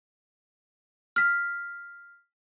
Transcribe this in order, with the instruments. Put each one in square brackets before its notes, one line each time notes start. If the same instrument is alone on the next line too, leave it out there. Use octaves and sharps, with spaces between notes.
[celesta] F6 B6